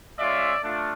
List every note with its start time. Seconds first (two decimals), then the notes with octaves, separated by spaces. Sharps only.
0.18 G#3 C#4 F4 D5 E5
0.63 A3 D4 F4